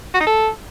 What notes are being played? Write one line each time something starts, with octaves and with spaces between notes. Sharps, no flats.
F#4
D#4
A4